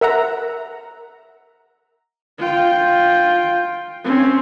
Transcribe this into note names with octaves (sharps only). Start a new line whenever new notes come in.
A#4 E5 F#5 A#5
F4 G5
C4 C#4